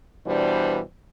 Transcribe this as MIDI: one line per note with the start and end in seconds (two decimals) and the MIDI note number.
0.25 0.80 47
0.25 0.80 52
0.25 0.80 55
0.25 0.80 62
0.25 0.80 72